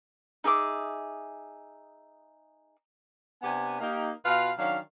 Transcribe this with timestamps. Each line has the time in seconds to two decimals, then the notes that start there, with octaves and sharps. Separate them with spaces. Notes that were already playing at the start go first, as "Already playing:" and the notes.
0.44 D#4 G#4 E5 D6
3.43 C3 B3 D4 G4 G#5
3.81 A#3 D#4 G4
4.24 B2 F4 B4 F5
4.58 D#3 F#3 C#4 D4 F5